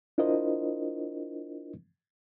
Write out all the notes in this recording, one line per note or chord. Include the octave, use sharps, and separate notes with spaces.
D4 E4 F4 A#4 C5 D#5